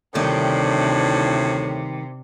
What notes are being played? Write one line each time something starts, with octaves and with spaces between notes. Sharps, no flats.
D2 A2 C3 D#3 G3 D4 E4